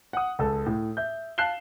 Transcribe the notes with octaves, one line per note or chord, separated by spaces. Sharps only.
F#5 D#6
C#2 A4
A2
E5 G6
F5 A5 F#6 C7 E7 G7